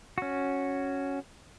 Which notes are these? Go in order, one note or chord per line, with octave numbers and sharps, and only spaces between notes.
C#4 F#4